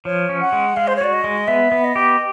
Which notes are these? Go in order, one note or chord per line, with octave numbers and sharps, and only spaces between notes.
F3 C#5
C#4
F#5
G#3
G#3 F5
C5
C#5
F#4 D5
D#5
G#3
B3 E5
B3
D#5
G4